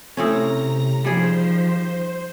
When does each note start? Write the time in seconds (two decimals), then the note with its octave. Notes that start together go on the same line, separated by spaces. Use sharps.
0.17 A2 C3 C4 C#4 A#5 A#6
1.04 D#3 F3 G3 G#4 C5